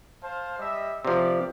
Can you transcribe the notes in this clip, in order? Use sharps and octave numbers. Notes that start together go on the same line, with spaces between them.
C5 F5 A5
G3 D#5 E5
C3 F3 G4 D5